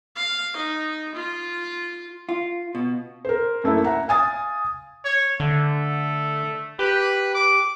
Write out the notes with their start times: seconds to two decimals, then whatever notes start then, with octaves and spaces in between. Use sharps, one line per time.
0.16 F5
0.57 D#4
1.15 F4
2.29 F4
2.75 B2
3.25 A#4 C5
3.64 F#2 A3 A#3 E4
3.84 E5 F#5 A#5
4.08 F5 G#5 D#6 A6
5.05 C#5
5.40 D3 A3
6.79 G4 B4
7.35 D6